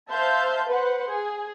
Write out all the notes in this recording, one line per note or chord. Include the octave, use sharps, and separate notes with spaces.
C5 E5 F5 A5 G6
B4 C5 F#5
G#4